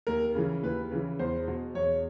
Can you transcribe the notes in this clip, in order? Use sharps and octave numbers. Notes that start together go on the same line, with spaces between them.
D#2 A#4
C#3 E3
D#2 B4
C#3 E3
E2 C5
B2
E2 C#5